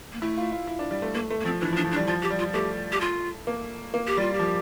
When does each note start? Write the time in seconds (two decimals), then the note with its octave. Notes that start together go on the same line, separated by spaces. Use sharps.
0.13 A#3
0.22 A3 E4
0.37 F4
0.52 F4
0.67 E4
0.79 D4
0.91 G3
1.02 A3
1.15 A3 A#3
1.30 A3
1.41 A#3
1.45 F3 C4
1.60 E3 D4
1.73 F3
1.77 D4
1.84 F3
1.91 D4
1.96 G3
2.07 F3 F4
2.23 G4
2.30 G3
2.39 F4
2.54 A3 G4
2.92 G4
3.01 F4
3.47 A#3
3.94 A#3
4.07 G4
4.17 G3 F4
4.33 G4
4.39 F3